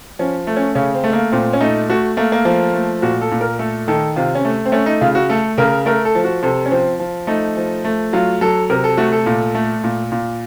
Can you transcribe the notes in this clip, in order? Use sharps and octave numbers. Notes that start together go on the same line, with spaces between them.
F3 C#4
A3
C#4
C#3 C#4
C4
A3
A#3
A#2 C4
C#4
A3 D#4
A3 F#4
A3 A#3
A#3
F3 A#3
A3
A#2 F#4
A4
A#2
A#4
A3 A4
D#3 A4
C3 F4
C#4
A3
C4
A3 C#4
D#4
C#3 F4
F#4
A3 A4
C#3 A#4
A3 A#4
A4
F3
F#4
C3 A4
C#4
F3 C4
F3
A3 D#4
F3
A3
F#3 F4
F#3 A4
C3 A#4
A4
A3 F#4
A4
A#2
A3
A#2
A#2